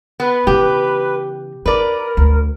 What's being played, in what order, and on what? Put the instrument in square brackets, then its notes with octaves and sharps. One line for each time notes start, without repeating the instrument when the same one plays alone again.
[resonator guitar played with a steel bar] B3 [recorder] B4
[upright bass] C#3 E3 [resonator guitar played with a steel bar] G4
[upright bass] D#4 [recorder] A#4 [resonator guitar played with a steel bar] B4 D5
[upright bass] D2